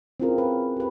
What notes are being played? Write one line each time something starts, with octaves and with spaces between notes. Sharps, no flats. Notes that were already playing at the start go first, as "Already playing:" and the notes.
C4 C#4 E4 F4 G#4 A#4
B4
G4 B4